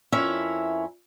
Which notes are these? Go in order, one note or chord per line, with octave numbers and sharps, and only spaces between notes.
F2 C#4 E4 A#4 E5